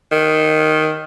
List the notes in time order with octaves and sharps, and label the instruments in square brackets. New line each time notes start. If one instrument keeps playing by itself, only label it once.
[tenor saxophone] D#3